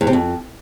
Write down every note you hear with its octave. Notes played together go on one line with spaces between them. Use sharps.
E2
C3
F2